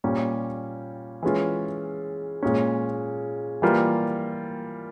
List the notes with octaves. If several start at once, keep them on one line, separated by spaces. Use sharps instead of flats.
A#2 G3 C#4
E3 G#3 C#4 F4
A#2 G#3 C#4
E3 G3 A#3 F4